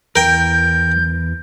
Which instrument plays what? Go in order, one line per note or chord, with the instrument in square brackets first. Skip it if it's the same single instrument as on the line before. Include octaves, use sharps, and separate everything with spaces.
[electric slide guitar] E2 [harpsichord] A#4 G5 [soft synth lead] G6